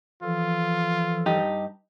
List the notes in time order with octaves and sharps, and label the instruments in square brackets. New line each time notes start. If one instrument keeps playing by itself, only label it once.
[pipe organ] E3 F3 A4 [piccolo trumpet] F4
[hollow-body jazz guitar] G2 D#4 G4